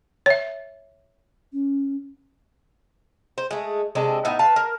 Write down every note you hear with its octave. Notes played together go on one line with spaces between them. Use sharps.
C#5 E5
C#4
C5
G#3 A3
C3 G#3 D4 A4
A2 B3 D#4 E5
B4 F5 A5
A#4